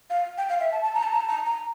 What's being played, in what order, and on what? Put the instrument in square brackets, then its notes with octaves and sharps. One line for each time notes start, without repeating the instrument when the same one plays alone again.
[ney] F5
G5
F5
E5
A5
A5
A#5
A5
A#5
A5
A#5
A#5